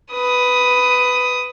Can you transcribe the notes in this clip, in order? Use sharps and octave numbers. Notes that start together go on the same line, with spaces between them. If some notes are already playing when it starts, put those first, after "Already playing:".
B4 D#6